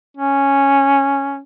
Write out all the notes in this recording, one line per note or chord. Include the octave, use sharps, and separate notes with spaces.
C#4